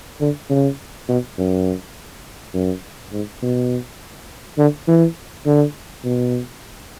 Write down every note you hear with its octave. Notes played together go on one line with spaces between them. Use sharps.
D3
C#3
B2
F#2
F#2
G#2
B2
D3
E3
D3
B2